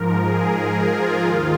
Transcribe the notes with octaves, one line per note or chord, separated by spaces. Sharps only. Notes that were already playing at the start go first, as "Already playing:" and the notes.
Already playing: G#2 F3 A#4
G#4
F4
D#2 D#3